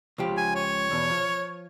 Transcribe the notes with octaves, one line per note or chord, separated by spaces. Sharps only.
C#2 F3 G4
G#5
C#5
E2 B2
F3